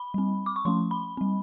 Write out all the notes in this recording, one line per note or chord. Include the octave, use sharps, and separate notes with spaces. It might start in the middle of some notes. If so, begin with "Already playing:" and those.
Already playing: B5
G3 C4
D6
C#6
F3 A3 C#4 C6
B5
G3 C4